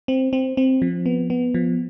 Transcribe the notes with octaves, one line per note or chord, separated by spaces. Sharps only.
C4
C4
C4
F3
B3
B3
F3